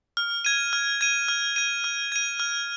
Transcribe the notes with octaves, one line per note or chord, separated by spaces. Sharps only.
F6
G#6 D#7
F6
G#6 D#7
F6
G#6 D#7
F6
G#6 D#7
F6